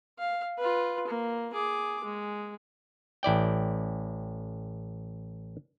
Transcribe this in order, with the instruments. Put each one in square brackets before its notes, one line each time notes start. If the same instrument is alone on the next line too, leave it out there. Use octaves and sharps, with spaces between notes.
[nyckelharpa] F5
F4 B4
A#3
G#4 D6
G#3
[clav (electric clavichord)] A1 E4 D5 G5